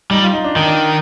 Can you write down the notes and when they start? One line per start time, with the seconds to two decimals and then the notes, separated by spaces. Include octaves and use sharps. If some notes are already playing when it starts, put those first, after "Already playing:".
0.11 G3 D#4
0.23 F4
0.33 D#4
0.44 D4
0.55 D#3 D#4
0.65 D4